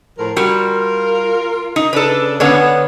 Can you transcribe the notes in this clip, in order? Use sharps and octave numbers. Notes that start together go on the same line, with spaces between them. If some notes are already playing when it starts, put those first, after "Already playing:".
A2 F3 A#4
G3 F4 F#4 A#4
D#4
C#3 D4 A4 B4
D3 B3 C#4 C#5